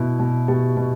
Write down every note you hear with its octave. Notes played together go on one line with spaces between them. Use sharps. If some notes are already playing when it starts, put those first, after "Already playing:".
Already playing: B2 E4
B2
B2 G4
B2